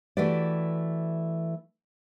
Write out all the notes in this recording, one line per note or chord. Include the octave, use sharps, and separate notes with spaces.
E3 A3 F#4 G4 B4 D5